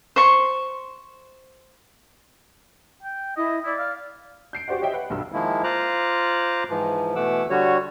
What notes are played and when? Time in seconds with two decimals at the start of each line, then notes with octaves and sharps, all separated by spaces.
0.16 C5 C6 C#6
3.03 G5
3.37 E4 D#5
3.65 E4 D5
3.79 F5
4.53 G6 C7 D7
4.68 F#4 G4 C5 D5 F#5
4.81 G4 C#5 D#5 E5 G5
4.93 B4 F#5
5.10 B1 G2 E6
5.32 D#3 F3 G#3 A#3 E4
5.64 F4 C5 A#5 D6 F#6
6.70 G#2 E3 F3
7.16 B2 E3 A3 F#5 D6 E6
7.50 D3 G3 F#4 C#5